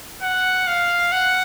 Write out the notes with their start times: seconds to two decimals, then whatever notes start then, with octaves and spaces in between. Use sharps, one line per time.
0.22 F#5
0.68 F5
1.12 F#5